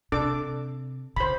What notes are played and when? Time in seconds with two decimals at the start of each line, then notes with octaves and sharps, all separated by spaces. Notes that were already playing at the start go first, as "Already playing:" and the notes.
0.12 C3 D4 A4 D6
1.16 C#3 C5 B5